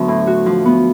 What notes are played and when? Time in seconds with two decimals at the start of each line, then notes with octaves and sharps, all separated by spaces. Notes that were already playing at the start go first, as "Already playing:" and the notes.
Already playing: D2 F#3 B3
0.08 A2
0.27 F#4
0.46 F3
0.65 B3